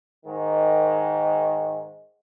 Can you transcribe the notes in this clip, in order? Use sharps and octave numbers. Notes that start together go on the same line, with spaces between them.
G#2 D#3